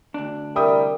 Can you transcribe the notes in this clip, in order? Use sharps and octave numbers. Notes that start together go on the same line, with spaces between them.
D2 D4
C2 G3 A#4 E5 G5 D#6